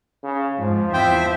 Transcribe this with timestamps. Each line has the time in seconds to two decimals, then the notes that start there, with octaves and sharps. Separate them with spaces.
0.23 C#3
0.59 F2 G#2 F3
0.94 E2 E3 C4 C5 E5 G5